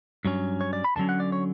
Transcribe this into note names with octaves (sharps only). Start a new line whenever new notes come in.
G2 F#3 C#4
C#5
D5
B5
E2 D3 F#3 C#4 A5
F#5
D5
C#5